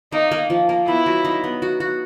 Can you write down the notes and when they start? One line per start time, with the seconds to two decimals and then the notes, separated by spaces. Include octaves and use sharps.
0.12 A#3 D#4
0.31 A#3
0.50 F3
0.69 A#3
0.87 B3 E4
1.06 F#3
1.25 D#4
1.44 B3
1.62 F#4
1.80 F#4